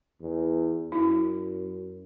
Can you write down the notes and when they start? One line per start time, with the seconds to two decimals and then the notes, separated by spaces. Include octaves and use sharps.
0.21 E2
0.92 F#2 E4